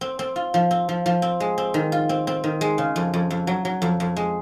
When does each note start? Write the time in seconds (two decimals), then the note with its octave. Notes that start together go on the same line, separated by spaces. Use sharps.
0.01 C4
0.19 C4
0.36 F4
0.54 F3
0.71 C4
0.89 F3
1.06 F3
1.22 C4
1.40 G#3
1.58 C4
1.74 D#3
1.92 F4
2.09 C4
2.27 C4
2.44 D#3
2.61 G#3
2.78 C#3
2.96 F2
3.14 F2
3.30 F2
3.47 F#3
3.65 F#3
3.82 F2
4.00 F2
4.17 G#3